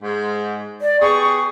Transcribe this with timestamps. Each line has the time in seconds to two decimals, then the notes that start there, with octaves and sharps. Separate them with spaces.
0.03 G#2
0.82 D5
1.01 B3 G4 G#4 C#6